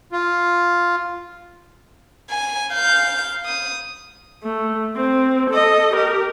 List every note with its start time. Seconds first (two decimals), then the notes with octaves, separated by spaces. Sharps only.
0.12 F4
2.31 G#5
2.73 F5 G6
3.46 D#6
4.43 A3
4.97 C4
5.50 A4 D#5
5.93 G4 A#4